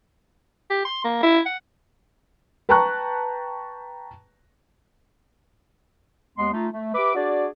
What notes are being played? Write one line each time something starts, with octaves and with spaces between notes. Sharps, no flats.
G4
C6
A#3
E4
F#5
B4 G5 A5 A#5 C#6 F#6
D#2 G#3 B3 C6
A3 D#4 F4
A3
G4 B4 E5 D6
D4 F#4 G#4 D5